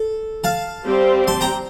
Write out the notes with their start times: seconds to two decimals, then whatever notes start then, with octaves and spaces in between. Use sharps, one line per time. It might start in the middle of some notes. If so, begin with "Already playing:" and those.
Already playing: A4
0.44 F5 A5
0.85 G3 C4 G4 C5
1.28 A5 C6
1.41 G5 A#5